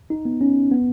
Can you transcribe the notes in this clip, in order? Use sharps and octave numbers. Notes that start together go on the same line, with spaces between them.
D#4
B3
C#4
B3